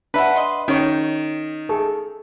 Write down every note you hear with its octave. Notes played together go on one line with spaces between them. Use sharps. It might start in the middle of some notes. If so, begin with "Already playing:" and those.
D4 A4 B4 E5 F#5
D#5 C6
D#3 C#4 C#5 G5 C#6
G#4 A4 C#6